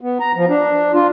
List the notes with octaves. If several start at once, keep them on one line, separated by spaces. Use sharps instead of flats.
B3
A#5
F3
D4
F4